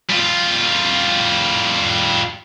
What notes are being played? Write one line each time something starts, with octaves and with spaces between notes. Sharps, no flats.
G3 F4